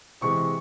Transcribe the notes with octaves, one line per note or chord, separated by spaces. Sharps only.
C3 E3 G#3 C#6